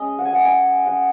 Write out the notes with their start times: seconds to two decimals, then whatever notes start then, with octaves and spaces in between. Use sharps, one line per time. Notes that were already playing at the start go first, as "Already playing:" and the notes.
Already playing: G#3 C#4 D#5
0.19 F#5
0.25 G#5
0.33 F#5
0.45 G#5
0.86 F#5